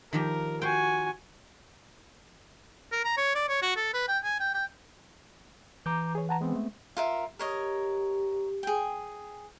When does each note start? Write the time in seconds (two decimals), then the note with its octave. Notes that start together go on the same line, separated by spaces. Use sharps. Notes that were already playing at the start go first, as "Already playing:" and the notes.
0.13 D#3 F3 G4 A#4
0.61 F#4 C5 G5 G#5
2.92 A#4
3.05 A#5
3.17 C#5
3.35 D5
3.49 C#5
3.63 F#4
3.77 A4
3.94 B4
4.09 G5
4.24 G#5
4.40 G5
4.54 G5
5.86 E3 A#5 D6 G6
6.15 G#4 C#5
6.29 F#5 A5 A#5
6.41 G#3 B3 C4
6.56 A3
6.97 F4 A#4 E5
7.39 G4 A#4 C#5 D#5
8.63 G#4 G5